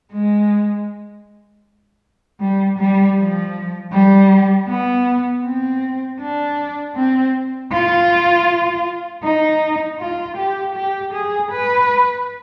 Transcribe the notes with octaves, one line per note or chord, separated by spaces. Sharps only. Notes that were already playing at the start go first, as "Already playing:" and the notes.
G#3
G3
G3
F3
G3
B3
C4
D4
C4
F4
D#4
F4
G4
G4
G#4
B4